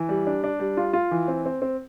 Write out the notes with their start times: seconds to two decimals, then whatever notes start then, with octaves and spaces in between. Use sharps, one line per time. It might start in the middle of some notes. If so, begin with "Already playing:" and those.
Already playing: E3
0.09 G3
0.27 D4
0.44 D4
0.60 G3
0.77 F4
0.93 F4
1.11 E3
1.28 C4
1.46 C4
1.62 C4